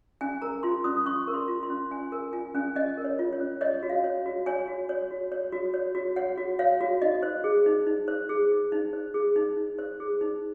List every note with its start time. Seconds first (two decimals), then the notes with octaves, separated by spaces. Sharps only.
0.21 C#4 G#5
0.42 A#4 A#5
0.63 F4 C6
0.84 C#4 D#6
1.06 C#4 C#6
1.28 A#4
1.34 C6
1.48 F4
1.63 C6
1.70 C#4
1.91 C#4 G#5
2.12 A#4 G#5
2.33 F4 G#5
2.55 C#4 G#5
2.75 C#4 D#5
2.98 A#4
3.04 C#5
3.19 F4
3.33 C#5
3.40 C#4
3.61 C#5 D#5
3.83 F#4
3.90 F5
4.04 C#5
4.26 F#4
4.46 C#5 G#5
4.68 F#4
4.89 C#5
5.11 F#4
5.32 C#5
5.52 F#4
5.74 C#5
5.95 F#4
6.16 C#5 F#5
6.38 F#4
6.59 C#5 F5
6.81 F#4
7.02 D#4 D#5
7.23 C5
7.44 G#4
7.66 D#4
7.87 D#4
8.08 C5
8.29 G#4
8.51 D#4
8.72 D#4
8.93 C5
9.14 G#4
9.36 D#4
9.57 D#4
9.79 C5
10.00 G#4
10.21 D#4